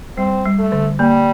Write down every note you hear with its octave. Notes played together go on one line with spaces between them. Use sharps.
G3 C4
G3
A3
D3
G3 A#3